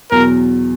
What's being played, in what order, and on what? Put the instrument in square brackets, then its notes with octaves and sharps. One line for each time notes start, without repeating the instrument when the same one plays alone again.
[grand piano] E2 B2 F#3 [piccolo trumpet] A#4